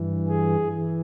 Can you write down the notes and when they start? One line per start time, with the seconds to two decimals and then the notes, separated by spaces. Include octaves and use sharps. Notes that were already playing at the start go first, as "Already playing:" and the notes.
Already playing: G2 E3
0.28 G#4
0.73 E3